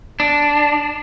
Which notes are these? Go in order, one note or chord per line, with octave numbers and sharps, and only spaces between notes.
D4